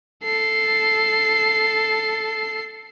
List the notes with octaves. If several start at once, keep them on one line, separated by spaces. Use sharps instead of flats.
A4 C7